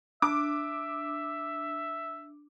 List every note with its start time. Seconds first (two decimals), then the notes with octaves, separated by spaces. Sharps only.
0.22 D4 E5 D6